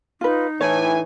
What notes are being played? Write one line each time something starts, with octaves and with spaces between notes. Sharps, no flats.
D#4 F4 B4
A2 E3 C#5 G#5